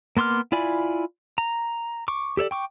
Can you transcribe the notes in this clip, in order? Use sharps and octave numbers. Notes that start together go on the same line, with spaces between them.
A#3 B3 C6 D6 F6
E4 F4 D5 G#5 B5
A#5
C#6 D6
G4 A4 C#5 D5
G5 C#6 D6